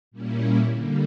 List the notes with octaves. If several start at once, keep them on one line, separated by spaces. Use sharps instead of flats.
A#2 G3 A#3 C#4 E4
D3 G3 A#3